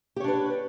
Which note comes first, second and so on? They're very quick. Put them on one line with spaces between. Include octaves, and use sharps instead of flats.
G4 C#5 D4 B4